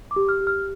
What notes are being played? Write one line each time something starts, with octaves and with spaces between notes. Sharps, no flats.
D6
G4
F6
G4
F6